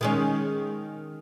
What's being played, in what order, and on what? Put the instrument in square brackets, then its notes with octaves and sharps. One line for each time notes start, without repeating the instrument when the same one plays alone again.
[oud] D#3 G#3 C#4